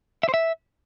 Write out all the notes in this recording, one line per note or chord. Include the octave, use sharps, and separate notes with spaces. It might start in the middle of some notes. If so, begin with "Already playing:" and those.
E5
C5
E5